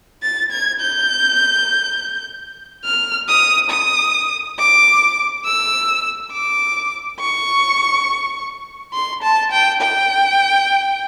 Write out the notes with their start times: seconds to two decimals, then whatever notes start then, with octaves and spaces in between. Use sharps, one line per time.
0.23 A6
0.52 G#6
0.80 G6
2.84 F6
3.28 D#6
3.70 D#6
4.58 D6
5.45 E6
6.32 D6
7.20 C#6
8.93 C6
9.23 A5
9.52 G5
9.81 G5